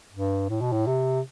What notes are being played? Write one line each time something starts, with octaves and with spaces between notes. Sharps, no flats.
G2
A2
B2
A2
C3